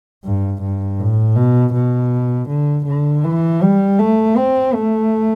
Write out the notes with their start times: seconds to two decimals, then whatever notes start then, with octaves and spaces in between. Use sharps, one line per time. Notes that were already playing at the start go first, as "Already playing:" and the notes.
0.25 G2
0.62 G2
0.99 A2
1.36 B2
1.74 B2
2.49 D3
2.86 D3
3.24 E3
3.62 G3
3.99 A3
4.37 C4
4.74 A3